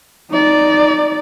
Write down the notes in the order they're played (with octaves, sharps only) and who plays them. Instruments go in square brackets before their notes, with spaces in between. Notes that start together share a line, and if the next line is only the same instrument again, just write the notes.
[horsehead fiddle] D#4 D5